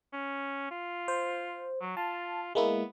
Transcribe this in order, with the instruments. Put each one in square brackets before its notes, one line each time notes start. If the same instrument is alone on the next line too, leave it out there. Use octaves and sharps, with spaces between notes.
[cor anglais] C#4
F4
[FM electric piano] C5
[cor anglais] F#3
[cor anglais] F4 [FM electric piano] A5
[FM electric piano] G#3 A#3 E4 [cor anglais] B3